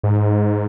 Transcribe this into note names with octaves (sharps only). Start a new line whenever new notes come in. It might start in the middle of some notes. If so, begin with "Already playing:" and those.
G#2